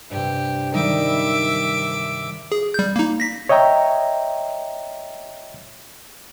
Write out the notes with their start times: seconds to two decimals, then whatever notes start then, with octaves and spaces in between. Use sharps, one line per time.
0.11 G2 C3 G4
0.74 D#3 G3 D#4 E5 D6
2.52 G#4
2.74 G3 G6
2.96 A#3 D#4
3.20 A#6 B6
3.49 C#5 D#5 E5 G5 A#5